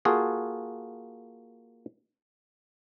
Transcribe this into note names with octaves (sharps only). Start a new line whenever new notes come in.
A#3 F4 F#4 G#4 A4